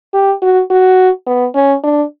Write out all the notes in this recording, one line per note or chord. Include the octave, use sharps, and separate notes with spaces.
G4
F#4
F#4
B3
C#4
D4